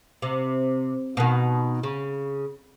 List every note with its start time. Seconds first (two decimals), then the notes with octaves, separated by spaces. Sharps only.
0.22 C3
1.17 B2 D#3
1.83 C#3